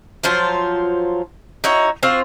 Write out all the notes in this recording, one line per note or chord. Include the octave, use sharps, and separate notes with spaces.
F3 F#3 F4 C5
D#4 E4 F#4 C#5
C4 F4 F#4 C5